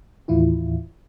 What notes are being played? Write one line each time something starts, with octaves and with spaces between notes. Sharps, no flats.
D#2 A2 E3 E4 F4